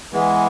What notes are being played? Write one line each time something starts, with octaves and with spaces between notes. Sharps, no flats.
E3 G#3 B3